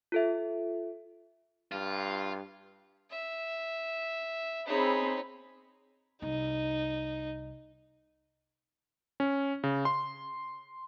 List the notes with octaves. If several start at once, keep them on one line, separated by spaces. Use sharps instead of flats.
F4 A4 E5
G2 F4
E5
C4 D#4 G#4 C#5 B5
C2 D#4
C#4
C#3
C6